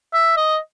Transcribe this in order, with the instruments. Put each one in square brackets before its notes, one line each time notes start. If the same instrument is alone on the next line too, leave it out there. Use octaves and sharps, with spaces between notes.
[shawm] E5
D#5